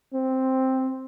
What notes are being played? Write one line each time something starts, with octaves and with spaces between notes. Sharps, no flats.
C4